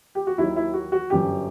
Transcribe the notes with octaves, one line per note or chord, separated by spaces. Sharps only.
G4
F#4
D#2 D#3 F#3 E4
E4
F#4
F#4
G1 F#2 F#3 G4